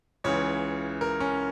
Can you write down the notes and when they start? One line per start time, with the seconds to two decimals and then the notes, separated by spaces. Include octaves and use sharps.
0.24 C#2 C#3 E3 C#5
1.01 A#4
1.20 C#4